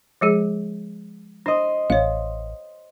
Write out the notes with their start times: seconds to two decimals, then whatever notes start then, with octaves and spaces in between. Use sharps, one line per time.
0.21 F3 G#3 G#4
1.46 D4 C5 D#5
1.90 A1 C#5 F5